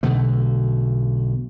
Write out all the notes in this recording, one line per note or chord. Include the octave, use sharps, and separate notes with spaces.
B1 B2 D3 A3